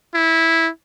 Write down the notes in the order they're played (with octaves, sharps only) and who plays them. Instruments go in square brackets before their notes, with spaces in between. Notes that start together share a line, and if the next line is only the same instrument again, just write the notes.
[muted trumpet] E4